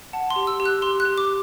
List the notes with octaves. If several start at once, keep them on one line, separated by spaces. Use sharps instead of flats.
F#5 A5
C6
G4
E6
G4
F#6
G4 C6
F#6
G4
D6